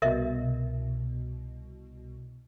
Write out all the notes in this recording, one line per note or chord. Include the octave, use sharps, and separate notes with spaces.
C2 B2 A#4 D#5 E5